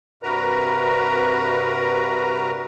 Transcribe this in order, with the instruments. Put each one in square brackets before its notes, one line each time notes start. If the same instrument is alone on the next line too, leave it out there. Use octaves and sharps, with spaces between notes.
[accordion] G2 C3 F#4 A#4 B4 A#5